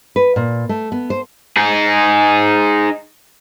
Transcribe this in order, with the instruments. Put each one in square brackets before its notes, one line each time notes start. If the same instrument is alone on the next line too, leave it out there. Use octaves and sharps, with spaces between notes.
[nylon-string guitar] B4
A#2
A3
B3
C5
[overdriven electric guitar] D#4 G#4